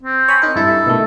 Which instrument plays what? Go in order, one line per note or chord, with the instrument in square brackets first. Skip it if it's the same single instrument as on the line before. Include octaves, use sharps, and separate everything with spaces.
[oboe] C4
[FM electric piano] C#5 G#5 B5
D#4 A#4
[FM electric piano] G2 E4 [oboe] A4
[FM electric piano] B2 D#3 A3